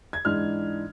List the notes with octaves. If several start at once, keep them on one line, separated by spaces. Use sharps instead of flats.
G#6
G#2 E3 G#3 D4 F6